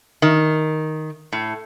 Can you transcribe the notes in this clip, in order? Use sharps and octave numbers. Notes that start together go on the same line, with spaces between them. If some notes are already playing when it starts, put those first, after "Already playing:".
D#3
A2